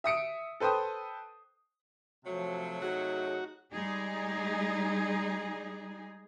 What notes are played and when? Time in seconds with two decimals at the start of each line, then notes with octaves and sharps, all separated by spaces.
0.04 E5 D#6 C#7 D7
0.60 A4 B4 C5 G5 D#6
2.25 C3 F3 F#3 A3
2.82 D#4 F#4 G#4
3.71 G3 G#3 D#4 G#4